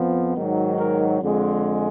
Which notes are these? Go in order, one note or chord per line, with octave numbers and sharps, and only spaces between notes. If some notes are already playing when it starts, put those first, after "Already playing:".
Already playing: F2 F3 B3
G#2 D#3 F#3
A#4
F2 D3 G#3